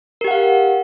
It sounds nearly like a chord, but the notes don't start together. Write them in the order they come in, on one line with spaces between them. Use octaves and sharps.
A#4 G4 F#5 F5